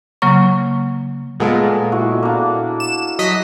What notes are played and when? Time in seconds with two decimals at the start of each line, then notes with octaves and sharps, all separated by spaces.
0.22 C#3 F#3 A#3 C#6
1.40 A#2 G#3 B3 A4 B4
1.92 E4 F#4
2.23 A#3 D4
2.80 E7
3.19 F#3 D#5 B6